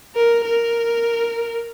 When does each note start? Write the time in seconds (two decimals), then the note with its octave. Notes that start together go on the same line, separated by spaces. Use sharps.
0.15 A#4
0.45 A#4